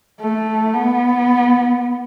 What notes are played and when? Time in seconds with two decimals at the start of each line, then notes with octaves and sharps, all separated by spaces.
0.21 A3
0.75 B3